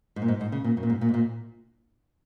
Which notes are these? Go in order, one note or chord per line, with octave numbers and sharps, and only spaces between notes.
G#2
A#2
G#2
G#2
C#3
A#2
F#2
A#2
G#2
A#2
G#2
A#2